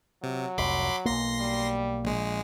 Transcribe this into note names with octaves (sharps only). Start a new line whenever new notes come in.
C3 F#3
F1 C2 B5 C6 D6
B1 A#3 C6 A#6 C7
G3
A#1 G#3